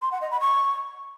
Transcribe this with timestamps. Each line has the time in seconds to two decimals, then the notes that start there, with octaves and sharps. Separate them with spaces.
0.02 C6
0.12 F#5
0.21 D#5
0.31 B5
0.41 C#6